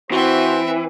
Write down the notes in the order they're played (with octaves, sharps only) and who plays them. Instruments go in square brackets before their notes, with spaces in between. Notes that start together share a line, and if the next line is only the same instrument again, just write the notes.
[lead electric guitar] E3 [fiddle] C4 E5 [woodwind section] F#4 C5